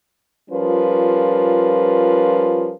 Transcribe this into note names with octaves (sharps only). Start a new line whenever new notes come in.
F3 G3 C#4 F4 A#4 B4